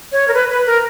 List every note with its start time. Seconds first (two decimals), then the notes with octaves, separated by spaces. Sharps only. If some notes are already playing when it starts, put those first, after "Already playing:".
0.12 C#5
0.28 A#4
0.34 B4
0.50 B4
0.66 A#4